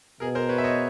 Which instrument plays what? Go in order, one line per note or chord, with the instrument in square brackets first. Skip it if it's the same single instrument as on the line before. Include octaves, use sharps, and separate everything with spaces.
[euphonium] B2 [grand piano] G#4 A#4
[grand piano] A#4 C5
B4 C#5
E5
C#5 D#5